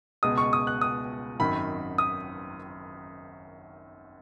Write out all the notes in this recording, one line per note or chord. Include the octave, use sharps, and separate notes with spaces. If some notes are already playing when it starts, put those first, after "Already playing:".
C#2 B2 G#3 D#6
C#6
D#6
F#6
D#6
G#1 F#2 D#3 F#3 B5
D#6